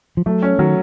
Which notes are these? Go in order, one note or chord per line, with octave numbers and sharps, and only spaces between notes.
F3
F#3 A3
C#4
D#3 F#3